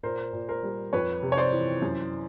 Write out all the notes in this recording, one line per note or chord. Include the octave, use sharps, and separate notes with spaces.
A#2 A#4 C5
A#2
A#4 C5
G3
F2 B4 C#5
C3
C#5
C5 D5
E3
F#2